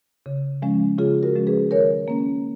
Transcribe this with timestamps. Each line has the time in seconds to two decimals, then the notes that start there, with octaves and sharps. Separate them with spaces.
0.26 C#3
0.62 F3 G#3 C#4
0.98 C#3 F4 G#4
1.23 F#4 A#4
1.35 F3 G#3 C#4
1.47 G#4 B4
1.71 D#3 A#4 C#5
2.08 A#3 C#4